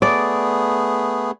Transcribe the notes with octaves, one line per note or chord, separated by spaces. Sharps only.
A3 B3 G#4 D5